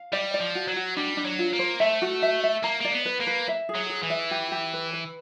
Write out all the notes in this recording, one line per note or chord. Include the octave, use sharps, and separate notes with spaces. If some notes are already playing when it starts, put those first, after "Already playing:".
Already playing: F5
G3 D5
D5
F3
F#4
F#3
F#4
G3 D4
D4
F#3
F4
A#3
C5
A3 E5
F#4
E5
E5
A#3 A#5
A#3 D5
B3
B4
A#3
B4
E5
G#4
F#3
G#4
E3
E5
G4
G4
B4
B4